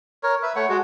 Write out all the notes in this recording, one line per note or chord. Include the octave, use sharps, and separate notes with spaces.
A#4 C#5
B4 E5
A3 C#5 F#5
G#3 F#4